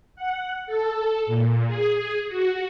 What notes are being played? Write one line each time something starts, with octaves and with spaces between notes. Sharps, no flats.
F#5
A4
A#2
G#4
F#4